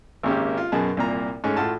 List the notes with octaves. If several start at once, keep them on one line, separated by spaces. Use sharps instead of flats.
G#1 C#3 A#3 C#4 G4
F4
F#2 B2 G#4 A5
C2 A#2 A#3 A#5
G#2 A3 C#4
A2 F4 F#4 A5